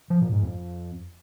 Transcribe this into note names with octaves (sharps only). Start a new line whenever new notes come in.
F3
A#2
G#2
F2